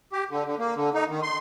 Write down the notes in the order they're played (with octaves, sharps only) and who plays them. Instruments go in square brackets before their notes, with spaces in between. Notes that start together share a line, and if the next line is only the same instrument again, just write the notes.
[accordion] G4
D3
D3
A#3
D3
D#4
D#3
C6